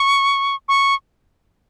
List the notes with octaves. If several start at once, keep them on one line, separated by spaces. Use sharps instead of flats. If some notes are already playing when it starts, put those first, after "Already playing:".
Already playing: C#6
C#6